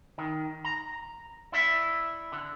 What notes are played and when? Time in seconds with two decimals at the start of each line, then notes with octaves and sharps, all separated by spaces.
0.18 D#3
0.64 A#5
1.52 E4 D5 E5
2.32 D3